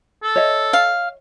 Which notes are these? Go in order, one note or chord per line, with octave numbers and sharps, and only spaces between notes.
A4
C#5 D#5 E5
F5